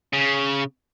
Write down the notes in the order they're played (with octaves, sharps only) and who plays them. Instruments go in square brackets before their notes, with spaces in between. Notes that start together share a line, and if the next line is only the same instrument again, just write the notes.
[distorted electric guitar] C#3